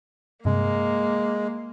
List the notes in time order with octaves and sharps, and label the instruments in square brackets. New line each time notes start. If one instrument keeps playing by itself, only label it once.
[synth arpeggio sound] G2 C3 [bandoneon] G#3 [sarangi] A#3